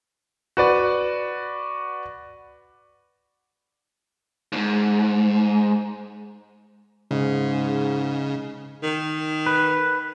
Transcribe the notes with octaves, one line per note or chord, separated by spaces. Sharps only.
F#4 B4 D5
D#2 G#2
G#2 C#3
D#3
B4